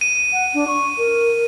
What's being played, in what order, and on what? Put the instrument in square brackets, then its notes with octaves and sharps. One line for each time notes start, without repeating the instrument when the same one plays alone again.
[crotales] D#7
[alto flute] F#5
D4
C#6
A#4